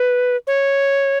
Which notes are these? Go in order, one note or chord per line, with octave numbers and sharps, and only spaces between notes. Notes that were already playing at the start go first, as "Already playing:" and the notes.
Already playing: B4
C#5